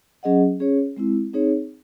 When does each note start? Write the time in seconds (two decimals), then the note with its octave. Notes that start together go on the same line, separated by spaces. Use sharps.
0.23 F#3 C#4 G#4 D#5 F#5
0.60 C#4 G#4 C#5
0.97 G#3 C4 E4
1.33 C4 D#4 G#4 C#5